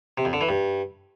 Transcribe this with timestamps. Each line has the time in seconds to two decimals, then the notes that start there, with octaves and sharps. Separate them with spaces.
0.18 C3
0.25 F2
0.33 D3
0.41 E3
0.49 G2